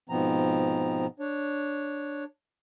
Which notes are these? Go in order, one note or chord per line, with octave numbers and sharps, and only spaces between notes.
G#2 B2 F3 B3 C4 A#5
D4 C#5